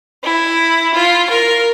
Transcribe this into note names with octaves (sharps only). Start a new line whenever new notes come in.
E4
F4
A#4